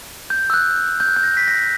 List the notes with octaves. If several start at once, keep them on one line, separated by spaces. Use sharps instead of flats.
G6
E6
F#6
G6
F#6
G6
A#6
B6
A#6